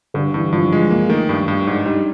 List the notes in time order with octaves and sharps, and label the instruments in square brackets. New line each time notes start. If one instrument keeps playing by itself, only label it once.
[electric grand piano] G2 [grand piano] D3
[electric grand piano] G2 [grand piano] E3
[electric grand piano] G2 [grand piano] F3
[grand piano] F3 [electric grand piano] G#3
[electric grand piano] A#3
[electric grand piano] D#3 [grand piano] A3
[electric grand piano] G2
G2
[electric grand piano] G#2 [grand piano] D4
[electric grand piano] G3 [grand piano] D#4